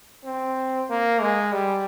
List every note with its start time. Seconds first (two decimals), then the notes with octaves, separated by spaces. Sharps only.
0.25 C4
0.90 A#3
1.21 G#3
1.53 G3